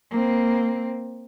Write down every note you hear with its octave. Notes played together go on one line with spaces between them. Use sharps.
A#3 C4